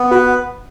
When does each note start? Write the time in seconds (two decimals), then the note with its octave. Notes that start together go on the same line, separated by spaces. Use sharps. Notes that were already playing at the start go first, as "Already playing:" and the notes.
Already playing: B3
0.11 F#4 B4